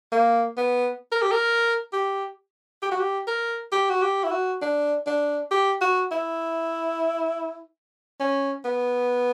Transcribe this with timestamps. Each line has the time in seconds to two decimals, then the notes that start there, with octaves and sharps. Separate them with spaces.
0.12 A#3
0.57 B3
1.12 A#4
1.22 G4
1.31 A#4
1.93 G4
2.82 G4
2.91 F#4
3.00 G4
3.27 A#4
3.72 G4
3.90 F#4
4.02 G4
4.24 E4
4.31 F#4
4.62 D4
5.07 D4
5.51 G4
5.81 F#4
6.11 E4
8.20 C#4
8.65 B3